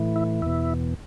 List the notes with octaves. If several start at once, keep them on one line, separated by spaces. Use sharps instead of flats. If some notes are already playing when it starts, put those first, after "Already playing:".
Already playing: A2 E3
E4
E2 B2 E4